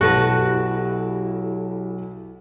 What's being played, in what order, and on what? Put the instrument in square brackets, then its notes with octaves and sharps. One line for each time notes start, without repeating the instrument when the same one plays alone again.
[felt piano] B1 A5 A#6 [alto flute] E4 [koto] F#4 B4 [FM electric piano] G4 A4